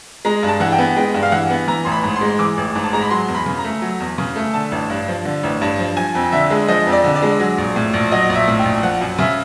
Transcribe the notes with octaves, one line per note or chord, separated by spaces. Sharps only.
G#3 A#5
G2
A5
E3 F#5
G5
B3
G#3 G5
G2
F5
E3 F#5
B3
E3 A#5
A1 C6
B5
G#2
C6
G#3
E3 D6
A1
G#2
A5
G#3 A#5
B5
F#3 C6
E2
B5
C#3
A#5
A3
F#3
E2
C#3
A3
D3 A5
A1
G2
F3
D3
A1
G2
F3
F3 G#5
F2
D3 E5
G#3
F3 D#5
F2
D5
D3
D5
G#3
F#3
A#1
A2
A#1
F#3 D#5
A#1
E5
A2
G5
A#1
F3 F#5
F#2
C#3 E5